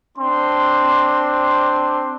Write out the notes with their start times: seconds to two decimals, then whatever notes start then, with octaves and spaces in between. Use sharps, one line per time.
0.18 C4 D4 C6